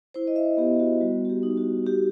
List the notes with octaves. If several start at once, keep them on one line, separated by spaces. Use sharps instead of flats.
E4 C5
D#5
E5
B3 G4
G4
F#4
G3 F#4
F#4
G4
D#4
F#4
F#4 G4